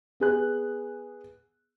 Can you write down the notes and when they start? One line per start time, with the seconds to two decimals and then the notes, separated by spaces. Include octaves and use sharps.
0.20 B3 G#4 F#6